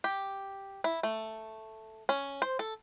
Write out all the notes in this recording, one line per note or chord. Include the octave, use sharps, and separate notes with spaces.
G4
E4
A3
C#4
C5
A4